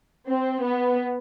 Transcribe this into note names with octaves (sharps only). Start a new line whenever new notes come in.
C4
B3